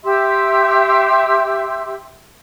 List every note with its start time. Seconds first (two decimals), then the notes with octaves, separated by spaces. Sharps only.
0.04 G4 E5 C6 E6